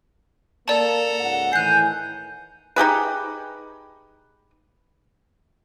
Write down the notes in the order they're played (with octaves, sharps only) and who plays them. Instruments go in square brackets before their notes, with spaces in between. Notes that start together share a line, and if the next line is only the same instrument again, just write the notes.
[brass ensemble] A#3 [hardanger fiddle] A4 A#5 [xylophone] D5 A5
[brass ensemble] C#2 G#2 F#5
[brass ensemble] A2 D#3 E3 [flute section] G#5 G6 [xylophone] F#6 C7
[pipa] D#4 G4 G#4 B4